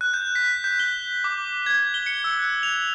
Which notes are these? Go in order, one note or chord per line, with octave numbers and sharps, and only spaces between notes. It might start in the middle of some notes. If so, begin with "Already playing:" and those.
F#6
G6
B6
G6
G7
D6
G#6
G7
C#7
E6
F#6
F7